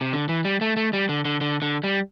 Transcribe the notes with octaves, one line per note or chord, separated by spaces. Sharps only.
C3
D3
E3
G3
A3
A3
G3
D3
D3
D3
D3
G3